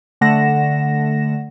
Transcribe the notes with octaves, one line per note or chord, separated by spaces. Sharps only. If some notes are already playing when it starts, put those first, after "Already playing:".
D3 A3 F#5 A#6 E7